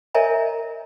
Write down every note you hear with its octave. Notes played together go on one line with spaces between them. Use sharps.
A#4 C#5 D#5 E5 G#5 A#5